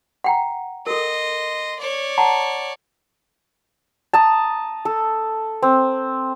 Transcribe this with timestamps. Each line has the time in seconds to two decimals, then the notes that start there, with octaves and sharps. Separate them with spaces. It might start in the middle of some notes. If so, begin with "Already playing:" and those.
0.24 F#5 G5 A#5
0.87 A4 A#4 D#5 C6
1.79 C#5 D5
2.18 F#5 A5 A#5
4.13 A5 A#5 D#6
4.85 A4
5.62 C4